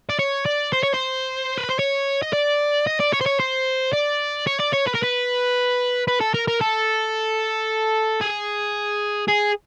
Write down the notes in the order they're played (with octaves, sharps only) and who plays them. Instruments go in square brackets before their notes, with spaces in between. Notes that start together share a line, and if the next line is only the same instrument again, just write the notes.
[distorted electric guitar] D5
C#5
D5
C5
C#5
C5
B4
C5
C#5
D#5
D5
D#5
D5
C#5
C5
C#5
C5
D5
C#5
D5
C#5
B4
A#4
B4
B4
A4
A#4
A#4
A4
G#4
G#4